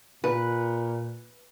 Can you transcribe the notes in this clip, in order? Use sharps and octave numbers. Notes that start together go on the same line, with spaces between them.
A#2 B4